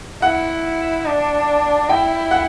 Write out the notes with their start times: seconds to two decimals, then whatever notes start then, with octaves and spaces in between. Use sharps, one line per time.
0.22 E4 F#5
1.06 D4
1.89 E4 G5
2.31 F#5